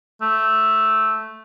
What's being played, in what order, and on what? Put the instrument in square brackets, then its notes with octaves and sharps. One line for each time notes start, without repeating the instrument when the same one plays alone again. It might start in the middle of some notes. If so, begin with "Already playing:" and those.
[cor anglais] A3